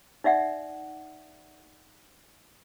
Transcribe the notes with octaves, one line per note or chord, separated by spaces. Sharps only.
D#4 D5 E5 F#5